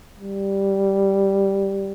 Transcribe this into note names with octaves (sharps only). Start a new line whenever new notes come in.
G3